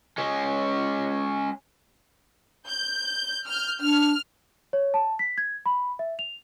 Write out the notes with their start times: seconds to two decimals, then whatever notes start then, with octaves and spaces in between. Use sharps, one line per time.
0.18 G#3 C#4
2.69 G6
3.47 F6 G6
3.81 D4 F6
4.73 C#5
4.94 A5
5.19 B6
5.38 G#6
5.66 B5
5.99 E5
6.19 F7